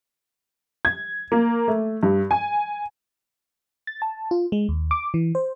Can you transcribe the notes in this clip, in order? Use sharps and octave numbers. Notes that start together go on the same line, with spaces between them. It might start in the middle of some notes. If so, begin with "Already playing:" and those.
G#6
A#3
A3
G2
G#5
A6
A5
F4
G#3
D#2
D6
E3
C5